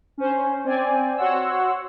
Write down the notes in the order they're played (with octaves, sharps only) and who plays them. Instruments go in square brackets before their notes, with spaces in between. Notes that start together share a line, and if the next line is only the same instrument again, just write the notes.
[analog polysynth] C#4 C5
C4 C5 D5 G#5
F#4 C#5 F#5 C6 E6